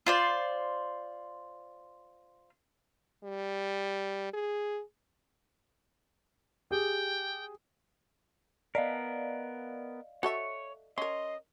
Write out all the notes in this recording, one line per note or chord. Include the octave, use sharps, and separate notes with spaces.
F4 C5 D5
G3
G#4
G4 G#4 G5
B3 A#4 D5 D#5 F5
F#4 A4 C#5 E5
C#4 A#4 D#5 C6